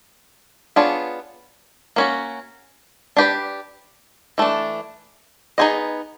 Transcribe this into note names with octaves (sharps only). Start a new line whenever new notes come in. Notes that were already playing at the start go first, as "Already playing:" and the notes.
B3 D4 F4 G#4 C#5
A#3 C#4 F#4
D4 G4 B4 D5
E3 A3 D4
B3 D#4 G#4 C5 D#5